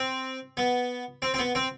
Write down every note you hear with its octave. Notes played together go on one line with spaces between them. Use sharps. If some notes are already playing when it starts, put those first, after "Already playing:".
Already playing: C4
B3
C4
C4
B3
C4